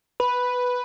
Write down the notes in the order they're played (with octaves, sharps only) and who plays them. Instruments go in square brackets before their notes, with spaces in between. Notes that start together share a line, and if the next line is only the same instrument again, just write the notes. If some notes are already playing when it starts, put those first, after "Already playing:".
[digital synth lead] B4 [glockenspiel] B5